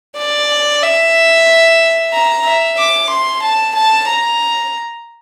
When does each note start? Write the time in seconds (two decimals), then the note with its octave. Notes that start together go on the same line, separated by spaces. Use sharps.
0.18 D5
0.84 E5
2.13 A#5
2.45 E5
2.78 D6
3.10 C6
3.42 A5
3.75 A5
4.08 A#5